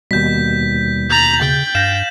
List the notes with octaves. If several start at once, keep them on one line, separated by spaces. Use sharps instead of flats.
D#2 B2 G3 G6 B6
A#5 G6 A6 F#7
C#3 G5
G2 F5 A#6 E7